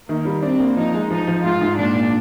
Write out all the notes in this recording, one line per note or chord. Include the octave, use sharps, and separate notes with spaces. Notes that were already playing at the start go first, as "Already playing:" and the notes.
D#3 A#3
G3
C4 D4
A#3
F3 D#4
G#3
F3 D#4
F3
G#2 F4
G#2
A#2 D4
A#2